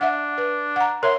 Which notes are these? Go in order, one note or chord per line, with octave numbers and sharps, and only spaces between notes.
D4 E5 F#5
B4
F#5 A#5
A#4 C#5 E5 C6